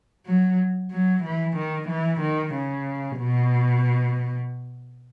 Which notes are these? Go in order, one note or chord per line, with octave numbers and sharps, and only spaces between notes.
F#3
F#3
E3
D#3
E3
D#3
C#3
B2